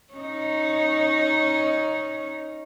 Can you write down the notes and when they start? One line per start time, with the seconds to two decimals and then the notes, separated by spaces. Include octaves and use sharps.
0.14 C#4 D#4